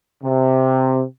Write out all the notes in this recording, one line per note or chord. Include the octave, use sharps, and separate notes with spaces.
C3